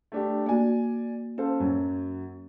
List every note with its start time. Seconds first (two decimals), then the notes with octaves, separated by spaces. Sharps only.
0.12 A3 D4 G4
0.46 A#3 F#4 D5 G#5
1.38 C#4 A4 C5 F5
1.60 F#2 F#3